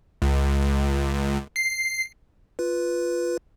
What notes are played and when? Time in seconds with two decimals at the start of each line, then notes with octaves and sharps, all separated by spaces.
0.22 C#2
1.56 C7
2.59 F4 B4